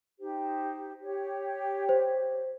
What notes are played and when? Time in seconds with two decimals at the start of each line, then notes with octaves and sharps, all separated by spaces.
0.19 D#4 G4 C5
1.01 G4 C#5
1.89 C5